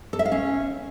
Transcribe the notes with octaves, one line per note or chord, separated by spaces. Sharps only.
A4
E5
F5
C#4